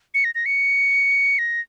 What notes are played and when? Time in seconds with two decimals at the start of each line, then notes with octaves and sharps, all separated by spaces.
0.14 C#7
0.24 A#6
0.35 A#6
0.46 C#7
1.39 A#6